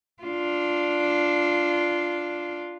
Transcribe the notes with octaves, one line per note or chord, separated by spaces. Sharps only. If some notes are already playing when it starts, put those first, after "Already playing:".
D4 F4